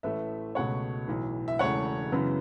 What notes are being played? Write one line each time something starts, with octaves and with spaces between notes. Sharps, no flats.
A1 A2 A3 B4 E5
C#2 B2 A3 C#5 F#5
B1 A2 E3
E5
E1 E2 C#3 A3 C#5 F#5
F#2 C#3 E3 B3